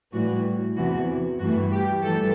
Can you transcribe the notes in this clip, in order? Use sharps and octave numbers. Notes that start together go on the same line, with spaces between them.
A2 E3 G3 F#4
E2 C3 E3 F#4
G2 E3 A3 F#4
G4
E3 G3 A4